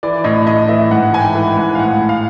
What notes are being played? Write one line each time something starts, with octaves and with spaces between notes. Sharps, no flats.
E3 D5
A2 D#5
A2 D#5
E3 E5
G#2 F#5
E3 G#5
G5
E3
G5
G#2
F5
A2 F#5
A2
F5